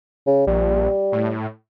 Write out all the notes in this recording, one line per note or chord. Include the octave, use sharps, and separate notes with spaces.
C#3
A#1 G3
A2